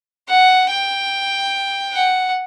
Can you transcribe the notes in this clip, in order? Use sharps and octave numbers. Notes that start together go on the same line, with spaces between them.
F#5
G5
F#5